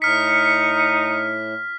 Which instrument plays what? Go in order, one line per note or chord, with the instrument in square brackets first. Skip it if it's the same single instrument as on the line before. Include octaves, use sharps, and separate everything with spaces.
[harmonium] A2 [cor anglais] D#4 [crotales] F6 B6 [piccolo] C#7